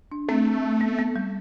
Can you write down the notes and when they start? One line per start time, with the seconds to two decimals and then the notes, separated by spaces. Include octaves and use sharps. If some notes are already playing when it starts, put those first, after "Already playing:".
0.12 D4
0.28 A3 C4
0.81 B3
0.98 B3
1.16 G3